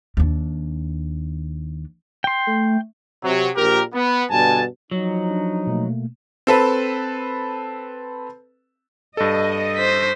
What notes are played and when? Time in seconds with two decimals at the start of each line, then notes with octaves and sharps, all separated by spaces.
0.17 D#2 D4
2.24 G5 C6
2.47 A3
3.23 C3 F#3
3.55 A#1 G4 A#4
3.93 B3
4.30 G2 B2 D3 G#5 A5
4.91 F3 F#3 D#4
5.30 D4
5.67 B2 A3 A#3
6.47 C4 A4 B4
9.17 G2 A4 D#5
9.77 C5 B6